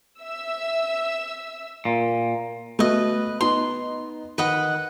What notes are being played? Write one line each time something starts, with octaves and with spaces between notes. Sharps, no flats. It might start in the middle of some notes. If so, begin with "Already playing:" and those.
E5 E6
A#2
A3 B3 F#4 B4 D#5
B3 D#4 C6
D#3 B4 D#5 F#5